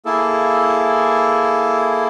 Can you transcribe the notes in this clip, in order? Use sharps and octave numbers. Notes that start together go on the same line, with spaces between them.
A#3 E4 G#4 A4